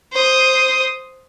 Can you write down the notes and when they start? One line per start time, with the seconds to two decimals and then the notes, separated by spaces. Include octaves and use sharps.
0.12 C5 D#6